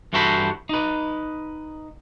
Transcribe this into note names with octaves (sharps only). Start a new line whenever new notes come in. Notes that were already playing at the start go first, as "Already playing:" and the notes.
G2 E3 F#4 A4 C5 B5
D#4 B4